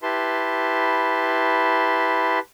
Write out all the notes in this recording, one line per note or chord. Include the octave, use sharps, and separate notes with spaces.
E4 G4 B4 A5 C6